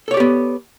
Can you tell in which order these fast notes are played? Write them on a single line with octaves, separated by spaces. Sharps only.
A4 C#5 D5 G4 B3